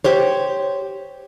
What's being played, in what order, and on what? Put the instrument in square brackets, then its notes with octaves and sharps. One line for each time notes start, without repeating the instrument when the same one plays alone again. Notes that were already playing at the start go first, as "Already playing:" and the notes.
[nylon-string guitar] G4 C5 C#5